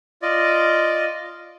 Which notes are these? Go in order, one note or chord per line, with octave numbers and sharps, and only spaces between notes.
F4 D5 D#5